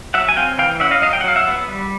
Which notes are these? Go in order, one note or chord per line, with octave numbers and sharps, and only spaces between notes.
F#3 E5 F#5
G#5
C4 F5 G5
E3 F5 G5
C#4 E5 F#5
D#5 F5
F#3 D#5 F5
G5
F#5
F#3 F5
E5 F#5
B3
G3